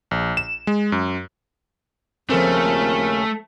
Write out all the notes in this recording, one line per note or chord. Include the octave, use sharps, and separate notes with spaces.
A#1
E7
G#3
F#2
D#2 C#3 F3 A3 C4 C#4 A#4